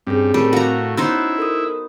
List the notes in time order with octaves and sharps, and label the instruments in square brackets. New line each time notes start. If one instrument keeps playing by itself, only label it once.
[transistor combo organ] G2 [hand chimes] C4 C#4 G#4
[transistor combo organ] A2 [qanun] G3 [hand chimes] C4 A#4
[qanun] F#4 A#5 [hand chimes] A4 F5 F#5
[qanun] B3 D#4 C5 [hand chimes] C#4 [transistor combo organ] E4
[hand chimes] A4 A#4 D#6